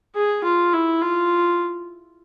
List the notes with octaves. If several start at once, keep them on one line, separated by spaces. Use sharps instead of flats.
G#4
F4
E4
F4